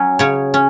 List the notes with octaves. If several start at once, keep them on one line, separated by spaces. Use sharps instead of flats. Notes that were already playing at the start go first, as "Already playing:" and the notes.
Already playing: F#3 C#4
C#3 C#5
C#4